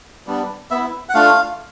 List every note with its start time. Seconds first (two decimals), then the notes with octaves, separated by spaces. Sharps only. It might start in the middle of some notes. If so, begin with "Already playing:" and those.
0.27 G3 B3 D4
0.71 B3 E4 E5
1.09 F#5
1.14 A3 D4 F4 F5